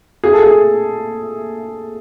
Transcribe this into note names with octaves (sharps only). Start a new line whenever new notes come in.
G#4
A4
G#4